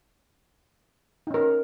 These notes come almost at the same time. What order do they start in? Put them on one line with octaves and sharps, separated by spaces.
D#4 C#4 A#4